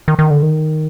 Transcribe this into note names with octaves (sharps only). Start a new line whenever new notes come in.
D#3
D#3
D3
D#3